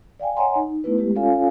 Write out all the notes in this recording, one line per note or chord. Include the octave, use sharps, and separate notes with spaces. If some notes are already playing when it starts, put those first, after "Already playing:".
D5 F5 G5 G#5
C#5 D#5 F#5 G#5 A#5 C6
D#4
A3 B3 E4 B4
G#3 G4
C#4 F4 A4 C#5 F5 G#5